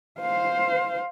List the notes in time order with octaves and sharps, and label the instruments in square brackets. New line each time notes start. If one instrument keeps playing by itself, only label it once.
[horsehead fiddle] C5 F5